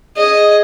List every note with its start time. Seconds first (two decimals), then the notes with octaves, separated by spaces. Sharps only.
0.16 G#4 D#5